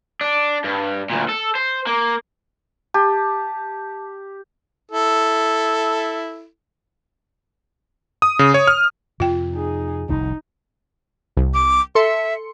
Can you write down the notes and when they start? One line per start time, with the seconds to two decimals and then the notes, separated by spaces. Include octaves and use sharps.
0.21 D4
0.64 G2
1.10 D2 A#2
1.29 A4
1.55 C5
1.87 A#3
2.94 G4 A5
4.91 E4 A4
8.22 D#6
8.39 C#3
8.54 C#5
8.68 F6
9.20 F2 C3 F4 G5
9.53 D#4 G#4
10.09 F1 C2 A2 D#4
11.37 C2
11.54 D6
11.95 A4 E5 C6 C#7